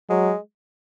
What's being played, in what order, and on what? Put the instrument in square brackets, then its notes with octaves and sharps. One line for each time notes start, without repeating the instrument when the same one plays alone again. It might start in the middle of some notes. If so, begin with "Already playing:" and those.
[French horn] F#3 [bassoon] G#3